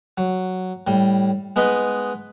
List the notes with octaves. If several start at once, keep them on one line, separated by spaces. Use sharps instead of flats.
F#3
A2 G3
G#3 B3 D#4 B4 D#5